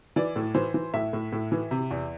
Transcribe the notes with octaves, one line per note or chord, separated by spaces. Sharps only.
E3 D5
A2
E3 C5
E3
A2 E5
A2
A2
E3
C3
E2